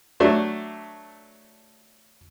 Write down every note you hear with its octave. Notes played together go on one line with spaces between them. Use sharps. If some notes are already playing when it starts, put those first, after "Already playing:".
F#3 A3 D4